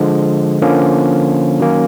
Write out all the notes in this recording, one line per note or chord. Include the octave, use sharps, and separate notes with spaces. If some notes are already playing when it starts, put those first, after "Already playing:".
Already playing: D3 F3 G#3
D3 F3 A#3 C#4
D#3 F#3 A#3 C#4